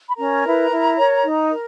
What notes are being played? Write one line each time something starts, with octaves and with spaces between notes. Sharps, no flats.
B5
C#4 A#4 A#5
E4 B4
E4
A#4 C#5
D#4
A#4